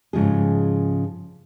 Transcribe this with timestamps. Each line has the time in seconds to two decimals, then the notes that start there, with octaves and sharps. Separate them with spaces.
0.13 G#2 C#3 F3 G#4